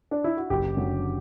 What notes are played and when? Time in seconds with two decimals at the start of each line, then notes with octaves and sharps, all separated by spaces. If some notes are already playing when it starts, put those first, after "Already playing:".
0.11 D4
0.24 E4
0.37 F#4
0.50 F#1 G4
0.77 F#2 D3 F#3